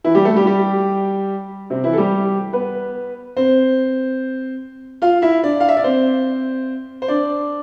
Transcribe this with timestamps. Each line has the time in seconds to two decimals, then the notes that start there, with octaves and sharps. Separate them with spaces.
0.04 E3 E4
0.15 G3 G4
0.25 A3 A4
0.36 G3 G4
0.46 G3 G4
1.70 C3 C4
1.84 E3 E4
1.93 A4
1.98 G3 G4
2.53 B3 B4
3.36 C4 C5
5.02 F4 F5
5.22 E4 E5
5.43 D4 D5
5.60 F5
5.69 E5
5.77 D5
5.84 C4 C5
7.02 C5
7.08 D4 D5